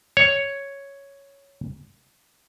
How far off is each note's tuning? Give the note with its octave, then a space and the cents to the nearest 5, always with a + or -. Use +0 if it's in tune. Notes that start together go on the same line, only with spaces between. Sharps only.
C#5 +0